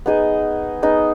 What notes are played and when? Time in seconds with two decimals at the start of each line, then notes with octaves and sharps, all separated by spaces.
0.06 B3 D#4 G#4 D#5
0.83 B3 D#4 G#4 D#5